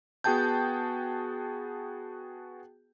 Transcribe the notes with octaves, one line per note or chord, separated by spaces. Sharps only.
B3 F#4 G#4 G5 A5 G6